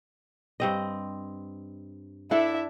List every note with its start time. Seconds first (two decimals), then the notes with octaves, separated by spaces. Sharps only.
0.60 G2 C4 D#5
2.31 D4 E4 A4 E5